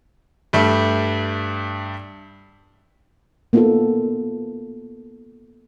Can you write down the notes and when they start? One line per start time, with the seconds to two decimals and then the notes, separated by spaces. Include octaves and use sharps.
0.53 G2 G3 A3
3.53 A#3 B3 D#4 F4 F#4 A4